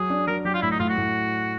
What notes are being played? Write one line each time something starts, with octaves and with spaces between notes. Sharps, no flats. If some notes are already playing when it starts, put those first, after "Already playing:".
Already playing: F#3 G#4
D4
F#3 A#4
F#3 G4
F4
A2 E4
D#4
A2 F4
F#4
A2